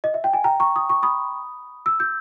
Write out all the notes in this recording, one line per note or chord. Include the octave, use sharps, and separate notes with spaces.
D#5
E5
G5
G#5
G5 A#5
A#5 C#6
D#6
C#6
B5 D#6
E6
G6